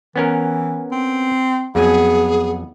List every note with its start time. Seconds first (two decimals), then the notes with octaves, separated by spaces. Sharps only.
0.16 E3 B3 C#4 A#4
0.92 C4
1.75 F2 F#3 B3 G#4 G#5